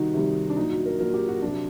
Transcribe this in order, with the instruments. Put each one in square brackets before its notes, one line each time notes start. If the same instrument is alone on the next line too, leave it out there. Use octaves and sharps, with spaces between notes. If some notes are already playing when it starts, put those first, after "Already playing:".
Already playing: [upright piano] C3 D#3 G3 D#4 F#4
C3 D#3 G3
D4
A#2 F#3 D#4
F#4
A#4
A#2 F#3 A#4
G4
F#4
C3 F#3 D4